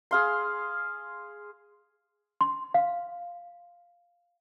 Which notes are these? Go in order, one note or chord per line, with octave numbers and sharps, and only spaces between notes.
G#4 F5 C6
C6
F5